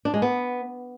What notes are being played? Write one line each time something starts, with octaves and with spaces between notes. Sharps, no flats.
D4
G#3
B3